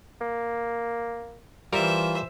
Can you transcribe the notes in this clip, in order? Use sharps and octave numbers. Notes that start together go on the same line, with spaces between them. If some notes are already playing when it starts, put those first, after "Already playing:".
A#3
E3 G3 F4 A#4 C5 E5